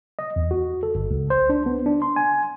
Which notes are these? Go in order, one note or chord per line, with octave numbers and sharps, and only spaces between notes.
D#5
E2
F#4
A4
G1
C#2
C5
D4
B3
D4
C6
G#5